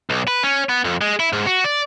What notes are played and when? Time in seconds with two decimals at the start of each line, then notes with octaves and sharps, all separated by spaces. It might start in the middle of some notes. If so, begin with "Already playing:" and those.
0.10 B1
0.28 B4
0.43 C#4
0.69 B3
0.84 F2
1.01 G#3
1.20 E4
1.33 G#2
1.46 F#4
1.64 D5